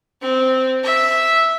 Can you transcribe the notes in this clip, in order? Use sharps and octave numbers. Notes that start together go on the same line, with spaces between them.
C4
E5